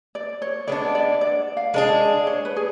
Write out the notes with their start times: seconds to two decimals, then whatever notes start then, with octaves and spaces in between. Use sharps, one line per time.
0.15 D5
0.42 C#5
0.67 G#3 B3 D4 D5
0.95 D5
1.21 D5
1.57 F5
1.74 G#3 D4 G#4 D5
2.27 C#5
2.45 B4
2.56 G#4